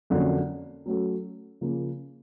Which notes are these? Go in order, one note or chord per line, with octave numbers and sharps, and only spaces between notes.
F2 D3 F#3 A#3 C#4
F#3 A3 C#4 F#4 A4
C#3 F3 A#3